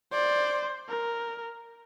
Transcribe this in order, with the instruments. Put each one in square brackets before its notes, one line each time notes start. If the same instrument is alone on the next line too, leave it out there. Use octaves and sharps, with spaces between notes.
[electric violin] C5 [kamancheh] D5
[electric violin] A#4